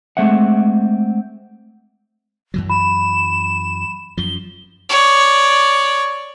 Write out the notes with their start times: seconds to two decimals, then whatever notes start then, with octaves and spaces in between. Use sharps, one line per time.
0.17 G#3 A3 C4 E5 F#5
2.54 F#2 E3 F#3
2.70 B5 E7
4.17 F#2 F3 G7
4.90 C#5 D5